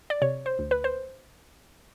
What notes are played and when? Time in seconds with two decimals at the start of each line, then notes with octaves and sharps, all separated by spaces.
0.10 D5
0.22 C3 C#5
0.46 C5
0.59 D2
0.71 B4
0.84 C5